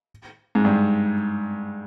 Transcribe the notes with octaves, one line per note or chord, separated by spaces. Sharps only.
G#2
G2